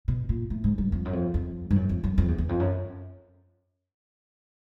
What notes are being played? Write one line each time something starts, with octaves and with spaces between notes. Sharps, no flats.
B2
A#2
A2
G#2
G2
F2
F#2
F2
F2
G2
F#2
F2
F#2
F2
E2
E2
F2
F#2